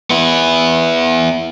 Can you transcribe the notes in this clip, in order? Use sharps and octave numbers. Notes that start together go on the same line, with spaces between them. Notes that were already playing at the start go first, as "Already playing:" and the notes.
B3 E4